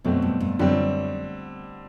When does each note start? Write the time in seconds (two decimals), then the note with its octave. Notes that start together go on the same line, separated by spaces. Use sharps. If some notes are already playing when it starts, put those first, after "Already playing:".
0.04 F#2 B2 A3 C4
0.22 G2
0.40 G2
0.59 F#2 D3 G3 C4